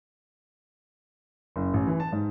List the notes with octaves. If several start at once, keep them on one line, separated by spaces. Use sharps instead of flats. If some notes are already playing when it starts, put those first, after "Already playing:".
F#1
A1
E3
A5
G#2